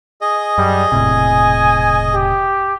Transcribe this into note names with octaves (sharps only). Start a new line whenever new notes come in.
G#4 D#5
F#2 G3
E1 A2 C3 G#5
G4